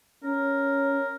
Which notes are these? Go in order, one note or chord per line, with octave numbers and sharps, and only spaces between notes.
C#4 A#4